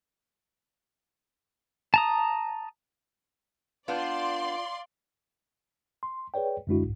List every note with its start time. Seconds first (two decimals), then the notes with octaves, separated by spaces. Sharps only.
1.94 A5 A#5 D#6
3.88 B3 D4 F4 D5 F5 C6 G6
6.03 C6
6.34 G#4 B4 C#5 D5 G5
6.67 F#2 D3 G#3 D4 E4 F#4
6.82 C2 G#2